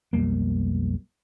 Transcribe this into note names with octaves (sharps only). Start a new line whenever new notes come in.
B1 F2 G3 A#3